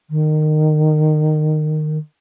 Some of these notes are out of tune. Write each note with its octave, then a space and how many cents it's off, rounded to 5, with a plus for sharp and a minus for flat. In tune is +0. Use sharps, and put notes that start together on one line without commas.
D#3 -20